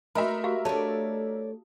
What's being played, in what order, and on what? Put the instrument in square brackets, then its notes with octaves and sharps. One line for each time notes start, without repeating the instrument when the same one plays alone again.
[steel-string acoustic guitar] A3 [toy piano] F#4 B5 [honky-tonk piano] A#4 D#5 E5
[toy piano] F#4 G4 F5
[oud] A3 D4 [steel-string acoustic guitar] C#5 D5 [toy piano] A5